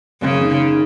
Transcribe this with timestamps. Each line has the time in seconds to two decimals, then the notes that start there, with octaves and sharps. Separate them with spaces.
0.22 F#1 C#3
0.41 D#3
0.60 D#3